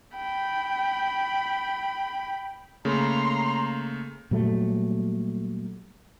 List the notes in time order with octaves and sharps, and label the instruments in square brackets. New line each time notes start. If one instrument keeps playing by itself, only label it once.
[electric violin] G5 B5
[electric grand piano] C#3 A3 A#3 [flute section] A#5 C6
[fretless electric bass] A#2 F#3 G3 A3